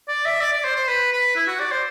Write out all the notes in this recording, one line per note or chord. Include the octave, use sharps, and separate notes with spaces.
D5
E5
D5
D5
C5
C5
B4
B4
E4
F#4
D5
C5